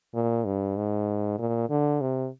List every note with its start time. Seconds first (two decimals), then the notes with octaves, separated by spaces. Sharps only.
0.14 A#2
0.45 G2
0.76 G#2
1.38 A#2
1.70 D3
2.01 C3